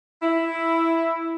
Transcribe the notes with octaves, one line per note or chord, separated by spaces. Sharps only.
E4